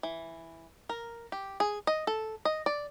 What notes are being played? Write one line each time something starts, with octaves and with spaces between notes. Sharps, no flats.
E3
A#4
G4
G#4
D#5
A4
D#5
D5